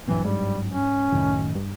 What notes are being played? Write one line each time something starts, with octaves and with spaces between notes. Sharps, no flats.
A#1 G2 E3 F#3 C4
G#2 G3
C#4
C2 F#2 A2 D#3
G2